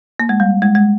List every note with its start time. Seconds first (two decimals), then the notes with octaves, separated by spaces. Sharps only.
0.20 A#3
0.29 G#3
0.40 G3
0.62 G#3
0.75 G#3